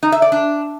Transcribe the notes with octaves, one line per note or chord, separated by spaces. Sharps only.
D#4
E5
D5
D4